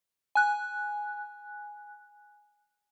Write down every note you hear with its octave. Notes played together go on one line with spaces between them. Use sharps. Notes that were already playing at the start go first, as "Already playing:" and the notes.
G#5 F#6